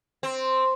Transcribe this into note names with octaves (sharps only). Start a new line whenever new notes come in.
C4